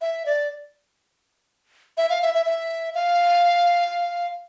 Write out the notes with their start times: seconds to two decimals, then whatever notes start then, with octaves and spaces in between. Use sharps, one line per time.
0.01 E5
0.26 D5
1.97 E5
2.10 F5
2.22 E5
2.35 E5
2.46 E5
2.95 F5